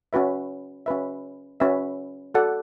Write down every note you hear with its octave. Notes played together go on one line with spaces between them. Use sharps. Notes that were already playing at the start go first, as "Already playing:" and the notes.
C#4 F#4 B4 E5
C#4 F#4 B4 E5
C#4 F#4 B4 E5
F#4 A4 D5 F#5